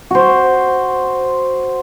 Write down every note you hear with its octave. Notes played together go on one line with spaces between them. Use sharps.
F#4 C5